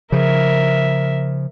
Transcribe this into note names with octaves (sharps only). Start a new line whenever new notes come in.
C#3 F3 A#4 E5